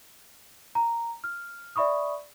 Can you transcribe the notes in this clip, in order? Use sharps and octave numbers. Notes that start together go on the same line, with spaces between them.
A#5
F6
D5 E5 B5 C#6 D#6